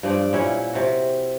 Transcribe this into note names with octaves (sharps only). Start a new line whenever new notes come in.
G2 F3 D5 G5
A#2 C#4 E4 F#5
C3 F#4